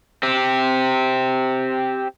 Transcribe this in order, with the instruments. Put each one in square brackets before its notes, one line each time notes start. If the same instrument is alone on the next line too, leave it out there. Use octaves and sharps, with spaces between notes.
[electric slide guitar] C4 G4